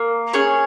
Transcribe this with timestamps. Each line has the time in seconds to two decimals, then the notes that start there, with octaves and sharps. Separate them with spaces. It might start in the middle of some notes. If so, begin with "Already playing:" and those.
Already playing: A#3
0.33 C#4 G#4 C#5